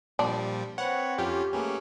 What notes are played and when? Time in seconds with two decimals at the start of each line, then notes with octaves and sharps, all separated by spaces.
0.19 A#2 F3 G3 D4
0.78 C4 B4 C#5 F#5
1.18 F2 C#4 F4 G4
1.52 A3 A#3 C#4 G#4 B4